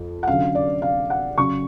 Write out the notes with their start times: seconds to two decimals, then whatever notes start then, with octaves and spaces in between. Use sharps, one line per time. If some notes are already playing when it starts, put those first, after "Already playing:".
Already playing: F2
0.23 F#5
0.27 D3 F#3 C#4 F5
0.55 D5
0.82 F5
1.10 F#5
1.38 C#3 F#3 C#4 C#6